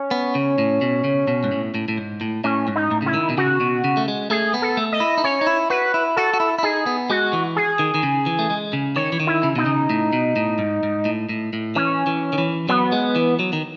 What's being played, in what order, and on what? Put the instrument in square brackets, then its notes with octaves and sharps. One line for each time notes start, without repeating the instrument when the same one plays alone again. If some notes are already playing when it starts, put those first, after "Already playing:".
Already playing: [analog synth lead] C#4
[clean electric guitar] B3
C#3
A2
B2
C#3
B2
G#2
A2
A2
A2
G#2
A2
[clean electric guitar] A2 [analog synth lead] C#4
[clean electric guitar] G#2
[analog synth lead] D#4
[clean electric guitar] A2
[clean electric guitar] C#3 [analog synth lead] E4
[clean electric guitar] D#3
B2
[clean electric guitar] C#3 [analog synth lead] F#4
[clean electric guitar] B2
C#3
A3
G#3
[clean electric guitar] A3 [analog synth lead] G#4
[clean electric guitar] B3
[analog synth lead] A4
[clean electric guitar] A3
[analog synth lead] D#5
[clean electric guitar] E4
D#4
[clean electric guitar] C#4 [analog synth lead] C#5
[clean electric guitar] D#4
E4
[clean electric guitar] F#4 [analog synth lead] B4
[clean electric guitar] E4
[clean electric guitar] F#4 [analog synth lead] A4
[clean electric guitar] F#4
E4
E4
[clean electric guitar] D#4 [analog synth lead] G#4
[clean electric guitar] B3
[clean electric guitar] G#3 [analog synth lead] F#4
[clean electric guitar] E3
[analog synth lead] G#4
[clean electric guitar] D#3
D#3
C#3
E3
A3
G#3
C#3
[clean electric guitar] D#3 [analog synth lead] C#5
[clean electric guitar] E3
D#3
[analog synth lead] E4
[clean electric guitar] C#3
[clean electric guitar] B2 [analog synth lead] D#4
[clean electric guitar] C#3
A2
B2
A2
G#2
G#2
A2
A2
A2
[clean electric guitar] E3 [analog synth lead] C#4
[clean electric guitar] E3
D#3
E3
[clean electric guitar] F#3 [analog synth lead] B3
[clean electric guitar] G#3
E3
F#3
D#3